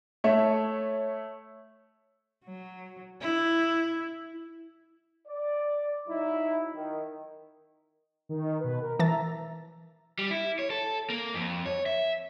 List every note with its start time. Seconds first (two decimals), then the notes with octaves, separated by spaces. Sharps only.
0.24 A3 C#5 E5
2.45 F#3
3.21 E4
5.28 D5
6.08 F#3 D#4 E4
6.74 D#3
8.29 D#3
8.60 B2 B4
8.81 A#4
8.99 E3 E5 A5 A#5 A6
10.19 G3
10.31 E4
10.59 C#5
10.70 A4
11.10 A#3
11.34 F2
11.66 C#5
11.86 E5